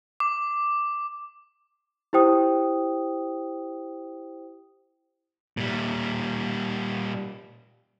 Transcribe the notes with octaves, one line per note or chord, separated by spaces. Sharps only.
D6
E4 G4 C5 G5 D#6
A#2 G3